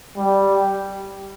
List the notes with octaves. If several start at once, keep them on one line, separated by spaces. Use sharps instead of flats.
G3